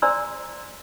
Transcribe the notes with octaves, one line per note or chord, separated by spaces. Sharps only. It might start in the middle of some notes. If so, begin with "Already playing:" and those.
C5 D5 G#5 A#5 C6 E6